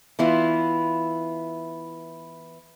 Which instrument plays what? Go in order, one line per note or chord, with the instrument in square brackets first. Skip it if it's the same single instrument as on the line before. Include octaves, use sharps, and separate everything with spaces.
[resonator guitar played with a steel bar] E3 B3 E4 F4